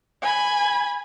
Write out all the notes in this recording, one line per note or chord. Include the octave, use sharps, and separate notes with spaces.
G#5 B5